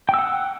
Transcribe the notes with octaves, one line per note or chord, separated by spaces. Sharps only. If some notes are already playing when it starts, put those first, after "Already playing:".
F#5 G5 E6